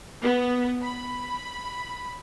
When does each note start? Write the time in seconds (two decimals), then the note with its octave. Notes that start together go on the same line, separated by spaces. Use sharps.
0.22 B3
0.83 B5